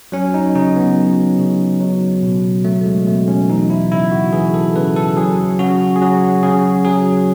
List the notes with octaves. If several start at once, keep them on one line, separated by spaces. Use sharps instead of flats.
F#3 C#4
D#4
C#3 D#4
B3
F#3
C#3
F#3
B2
F#3 A3
G#3
B2 A3
C#4
E3 D#4
E4
C#3 E4
F#4
E3 G#4
A4
C#3 B4
A4
F#3 G#4
C#3 F#4
G#4
F#3 F#4
C#3 G#4
F#3 G#4